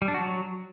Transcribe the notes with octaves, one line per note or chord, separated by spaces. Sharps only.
G3
D4
F#4
F#3